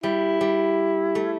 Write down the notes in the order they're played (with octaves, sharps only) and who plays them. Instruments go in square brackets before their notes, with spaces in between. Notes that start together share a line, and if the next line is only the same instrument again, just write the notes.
[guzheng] G3 [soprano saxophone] E4
[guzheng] G3
A3